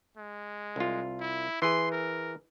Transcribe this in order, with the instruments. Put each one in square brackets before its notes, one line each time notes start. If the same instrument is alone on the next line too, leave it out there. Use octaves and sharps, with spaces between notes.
[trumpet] G#3
[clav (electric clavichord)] C2 F4
[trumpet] E4
[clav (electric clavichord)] E3 G#4 [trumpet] C6
[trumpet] A#4